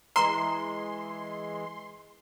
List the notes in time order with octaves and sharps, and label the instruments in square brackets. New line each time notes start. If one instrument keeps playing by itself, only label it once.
[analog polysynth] E3 G#3 [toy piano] A#5 [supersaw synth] C6